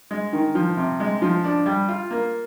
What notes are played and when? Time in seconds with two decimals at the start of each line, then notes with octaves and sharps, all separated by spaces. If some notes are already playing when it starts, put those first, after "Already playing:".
0.11 G#3
0.33 D#3
0.55 F3
0.77 C3
1.00 G#3
1.22 F3
1.44 D4
1.66 G3
1.89 F4
2.11 A#3